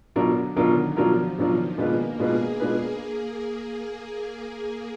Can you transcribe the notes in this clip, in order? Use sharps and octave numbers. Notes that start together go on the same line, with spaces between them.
B2 D3 F#3 D4 F4 A#4
B2 D#3 F#3 D4 F4 A#4
B2 F3 F#3 D4 F4 A#4
B2 D#3 F#3 D4 F4 A#4
B2 G#3 A#3 D4 F4 B4
B2 G#3 D4 F4 G#4 B4
B2 G#3 D4 F4 B4